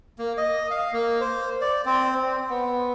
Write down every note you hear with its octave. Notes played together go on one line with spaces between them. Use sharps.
A#3
D#5
F5
A#3
C5
D5
C4
C4
B3